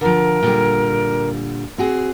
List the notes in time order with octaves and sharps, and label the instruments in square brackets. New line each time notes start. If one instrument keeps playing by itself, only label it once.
[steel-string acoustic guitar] D3 F3 [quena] A#4
[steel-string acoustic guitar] A#2 D3 G3
C4 F#4 G#4